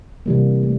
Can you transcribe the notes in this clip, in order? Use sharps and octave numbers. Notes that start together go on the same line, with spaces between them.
C3 E3 G3 A#3
A3